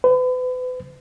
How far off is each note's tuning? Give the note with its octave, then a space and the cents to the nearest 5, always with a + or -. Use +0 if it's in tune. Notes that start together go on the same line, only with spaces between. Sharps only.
B4 +40